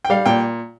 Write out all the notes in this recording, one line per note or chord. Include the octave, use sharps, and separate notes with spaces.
G5
G3 F5
A#2 G5